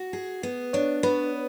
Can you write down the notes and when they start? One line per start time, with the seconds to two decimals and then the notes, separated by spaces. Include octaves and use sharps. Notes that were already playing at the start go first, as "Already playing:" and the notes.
Already playing: F#4
0.13 G#4
0.43 B3
0.73 D4 C#5
1.03 B3 B4